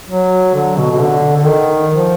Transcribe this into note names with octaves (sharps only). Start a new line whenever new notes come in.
F#3
D3
B2
B2
D3
D3
D#3
F3